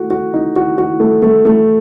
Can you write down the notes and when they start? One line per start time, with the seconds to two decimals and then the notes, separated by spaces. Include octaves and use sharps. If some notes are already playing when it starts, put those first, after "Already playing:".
Already playing: A3 F#4
0.10 F#4
0.34 D#4
0.56 F#4
0.78 F#4
1.00 A3
1.22 A3
1.45 A3